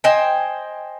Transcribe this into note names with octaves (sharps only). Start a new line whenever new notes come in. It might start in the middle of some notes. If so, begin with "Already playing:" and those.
C5 D#5 G5 G#5